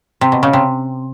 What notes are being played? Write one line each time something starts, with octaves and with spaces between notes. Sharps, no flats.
C3
B2
C#3
C3